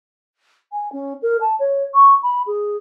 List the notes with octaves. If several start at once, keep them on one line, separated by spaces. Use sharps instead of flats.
G#5
C#4
A#4
A5
C#5
C#6
B5
G#4